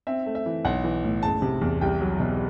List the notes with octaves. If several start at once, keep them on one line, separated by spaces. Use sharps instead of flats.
C4 E5
A3
E5
E3
B1 F#5
E3
A2
F#1 A5
C3
E2
C2 G5
F#3
B2